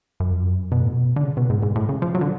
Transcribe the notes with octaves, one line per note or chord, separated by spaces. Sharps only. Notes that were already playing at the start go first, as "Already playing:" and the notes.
F#2
F2
F#2
B2
A2
B2
D3
C#3
B2
G#2
G#2
A2
C#3
F3
F#3
D3